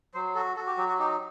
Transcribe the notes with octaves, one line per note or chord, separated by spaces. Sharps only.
F#3 C5
F#4 A4
F#4 A4
G4
F#3 G4
F#4
D#4 G4